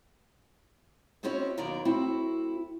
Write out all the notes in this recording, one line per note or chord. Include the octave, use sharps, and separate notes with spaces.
G#3 C4 C#4 E4 F#4 C#5
D#2 B2 F#3 A#4 D5 A#5
A3 C4 E4 F#4